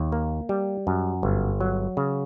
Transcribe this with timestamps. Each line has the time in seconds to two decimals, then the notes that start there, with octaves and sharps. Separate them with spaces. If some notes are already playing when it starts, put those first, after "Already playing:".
Already playing: D#2
0.12 A#3
0.49 G3
0.87 F#2
1.23 G1
1.61 F#3
1.97 C#3